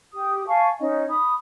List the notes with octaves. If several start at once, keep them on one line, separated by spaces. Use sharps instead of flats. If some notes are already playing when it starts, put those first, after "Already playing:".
G4 D#6
F5 G#5 A5 C#6
C#4 D#4 D#5
B5 D#6